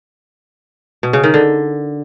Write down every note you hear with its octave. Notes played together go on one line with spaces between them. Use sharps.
B2
C#3
D#3
D3